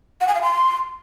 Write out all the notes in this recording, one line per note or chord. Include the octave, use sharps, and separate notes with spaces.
F#5
G#5
F5
C6